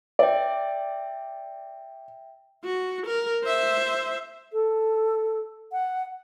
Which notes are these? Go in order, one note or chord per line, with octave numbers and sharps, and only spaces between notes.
D5 E5 G5
F#4
A#4
C5 E5
A4
F#5